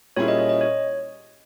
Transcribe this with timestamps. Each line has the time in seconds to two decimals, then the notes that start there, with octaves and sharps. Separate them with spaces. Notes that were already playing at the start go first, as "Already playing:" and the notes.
0.16 A#2 G3 C#4 E4 G#4 C#5
0.28 D#5
0.39 C#5
0.49 D#5
0.61 C#5